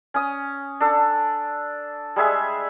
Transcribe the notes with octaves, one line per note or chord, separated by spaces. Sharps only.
C#4 D#6
D4 A4
G3 G#3 G#4 E5